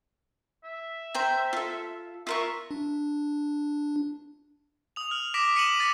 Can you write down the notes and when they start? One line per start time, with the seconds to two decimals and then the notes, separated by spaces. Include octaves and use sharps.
0.64 E5
1.14 C5 G5 A#5
1.53 F4 A4
2.27 F4 A#4 E5 C#6
2.71 D4
4.96 D#6 F7
5.11 F6
5.34 D6 A#6 B6 D7 E7
5.56 B6 C#7 D#7 E7 F#7
5.79 D6 A6 B6